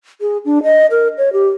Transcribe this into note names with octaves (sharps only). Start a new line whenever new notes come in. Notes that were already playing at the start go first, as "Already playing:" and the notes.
G#4
D4
D#5
A#4
C#5
G4